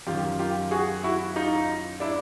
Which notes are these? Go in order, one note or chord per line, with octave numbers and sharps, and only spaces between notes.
F#2 D#3 F4 G4
F4 G4
F#4 G#4
E4 F#4
D#4 F4
D4 E4